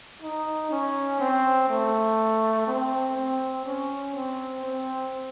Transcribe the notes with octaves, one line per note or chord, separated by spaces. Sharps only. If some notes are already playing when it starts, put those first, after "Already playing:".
D#4
C#4
C4
A3
C4
C4
C#4
C4
C4